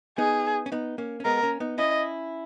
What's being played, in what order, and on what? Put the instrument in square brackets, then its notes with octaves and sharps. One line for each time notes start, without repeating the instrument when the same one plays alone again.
[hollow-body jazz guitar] B3 D#4 [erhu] G#4
[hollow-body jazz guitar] C#4
B3 D#4
A#3 C#4
C#4
[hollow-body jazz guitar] G#3 B3 [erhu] A#4
[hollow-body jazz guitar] A#3 C#4
B3 D#4
[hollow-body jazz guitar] C#4 E4 [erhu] D#5